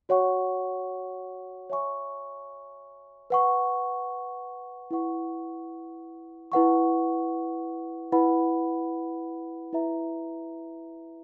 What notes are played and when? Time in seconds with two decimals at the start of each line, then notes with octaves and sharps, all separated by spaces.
0.09 F#4 C#5 F#5 C#6
1.70 C#5 E5 G#5 C#6
3.30 B4 F#5 C#6
4.91 E4 B4 F#5 C#6
6.52 E4 B4 F#5 C#6
8.12 E4 B4 F#5 B5
9.73 E4 B4 E5 A#5